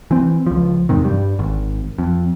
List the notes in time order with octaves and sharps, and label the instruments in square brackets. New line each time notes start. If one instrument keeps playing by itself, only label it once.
[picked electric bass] E3 C4
C#2 F3
E2 G#2 C3 D#3
G2 G3
G#1
F2